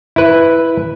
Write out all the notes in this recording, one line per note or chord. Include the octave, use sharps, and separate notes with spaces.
E4 B4